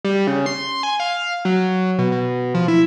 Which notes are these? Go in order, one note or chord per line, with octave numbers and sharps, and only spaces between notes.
G3
C#3
C6
G#5
F5
F#3
B2
B2
F3
E4